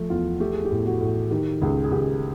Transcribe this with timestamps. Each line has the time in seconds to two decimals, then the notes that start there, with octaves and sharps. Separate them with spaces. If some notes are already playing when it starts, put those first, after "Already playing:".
Already playing: F3 A3
0.09 E2 F4
0.40 A3 G4
0.53 G#4
0.65 G4
0.71 A2
0.85 F#4
1.01 A2
1.31 D#3 G4
1.61 C#2 G#4
1.84 G#4
1.91 C#2 G4